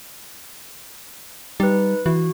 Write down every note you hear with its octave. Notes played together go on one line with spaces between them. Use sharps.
G3 D#4 B4
E3 F#4